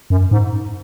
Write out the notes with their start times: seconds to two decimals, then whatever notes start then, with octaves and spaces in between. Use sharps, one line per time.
0.10 F#2
0.31 G#2